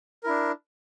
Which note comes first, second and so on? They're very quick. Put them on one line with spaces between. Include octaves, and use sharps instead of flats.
A#4 E4 D4